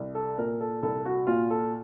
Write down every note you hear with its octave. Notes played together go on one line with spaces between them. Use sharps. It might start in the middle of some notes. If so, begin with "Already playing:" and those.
Already playing: C2
A4
A#2 A#4
A4
C2 A4
F#4
A#2 F4
A4